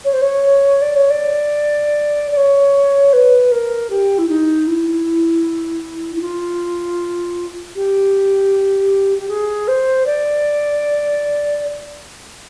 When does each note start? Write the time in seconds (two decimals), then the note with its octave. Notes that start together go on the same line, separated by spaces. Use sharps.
0.04 C#5
0.13 C5
0.21 C#5
0.81 D5
0.95 C#5
1.10 D5
2.31 D5
2.36 C#5
3.13 B4
3.51 A#4
3.90 G4
4.18 E4
4.29 D#4
4.67 E4
6.15 E4
6.21 F4
7.75 G4
9.18 G4
9.29 G#4
9.68 C5
10.06 D5